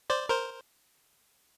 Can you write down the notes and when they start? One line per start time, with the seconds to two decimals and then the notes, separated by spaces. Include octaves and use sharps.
0.10 C5 D5
0.29 A#4 C5